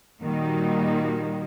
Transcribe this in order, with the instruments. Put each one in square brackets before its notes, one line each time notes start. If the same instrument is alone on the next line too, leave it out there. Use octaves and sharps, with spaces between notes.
[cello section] A#2 D#3 G3 A#3 D#4 F#4